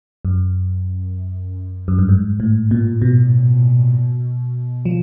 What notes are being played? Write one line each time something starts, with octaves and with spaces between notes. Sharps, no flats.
F#2
F#2
G2
G#2
A2
A#2
B2
F3